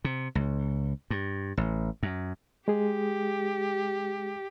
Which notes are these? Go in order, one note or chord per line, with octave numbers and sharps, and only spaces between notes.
C3
C#2
G2
A1
F#2
G#3 G4 G#4